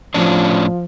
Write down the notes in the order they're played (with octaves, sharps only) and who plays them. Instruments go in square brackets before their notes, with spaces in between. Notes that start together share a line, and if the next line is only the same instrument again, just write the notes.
[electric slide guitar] A2 C#4 D4 [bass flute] F3